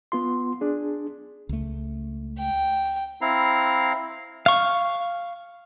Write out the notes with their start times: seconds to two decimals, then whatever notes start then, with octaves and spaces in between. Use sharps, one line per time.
0.12 B3 F4 C6
0.61 D4 G#4
1.49 C#2 A3
2.39 G5
3.21 C4 E4 F5 A#5
4.46 F5 C#6